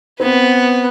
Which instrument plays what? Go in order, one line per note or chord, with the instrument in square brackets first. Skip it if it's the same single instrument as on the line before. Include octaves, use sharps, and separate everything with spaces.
[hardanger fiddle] B3 B4 [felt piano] C4